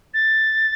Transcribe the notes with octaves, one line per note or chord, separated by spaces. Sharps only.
A6